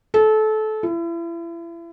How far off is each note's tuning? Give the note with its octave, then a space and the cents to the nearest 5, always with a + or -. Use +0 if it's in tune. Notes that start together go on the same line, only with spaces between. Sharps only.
A4 -25
E4 +35